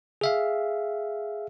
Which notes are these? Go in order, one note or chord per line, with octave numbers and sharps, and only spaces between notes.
G#4 E5 F5